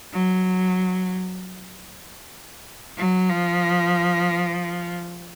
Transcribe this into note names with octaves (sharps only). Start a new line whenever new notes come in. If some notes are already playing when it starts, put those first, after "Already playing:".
F#3
F#3
F3